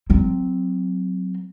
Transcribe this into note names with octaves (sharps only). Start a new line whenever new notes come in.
F#3 C4